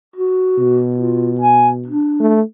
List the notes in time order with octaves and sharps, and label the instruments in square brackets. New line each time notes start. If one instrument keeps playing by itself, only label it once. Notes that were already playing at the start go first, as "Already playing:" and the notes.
[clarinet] F#4
[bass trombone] B2
[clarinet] F4
G#5
D4
[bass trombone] A3